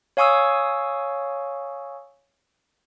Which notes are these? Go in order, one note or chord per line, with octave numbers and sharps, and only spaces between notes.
C#5 F5 G#5 C#6 D#6 E6